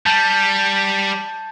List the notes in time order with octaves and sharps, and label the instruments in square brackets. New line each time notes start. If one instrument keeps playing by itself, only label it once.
[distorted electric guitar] G3 [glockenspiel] A5 G6 A6